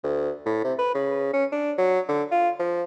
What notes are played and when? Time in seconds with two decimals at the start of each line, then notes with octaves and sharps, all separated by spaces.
0.03 D2
0.45 A2
0.64 C3
0.78 B4
0.94 C#3
1.33 C#4
1.52 D4
1.78 F#3
2.08 D3
2.31 F4
2.59 F3